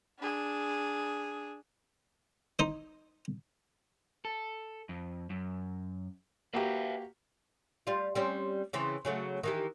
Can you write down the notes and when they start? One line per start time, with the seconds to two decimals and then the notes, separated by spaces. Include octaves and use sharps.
0.20 D4 G#4
2.59 D#4 C5
4.25 A4
4.89 F2
5.30 F#2
6.54 A#3 F#4 G4 B4 E5 F5
7.87 G3 F4
8.15 G3 C4 C#4
8.73 C#3 E3 C4
9.05 C#3 F#3 A3
9.43 D#3 E3 G4